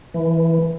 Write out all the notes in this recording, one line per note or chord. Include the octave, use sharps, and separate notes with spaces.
E3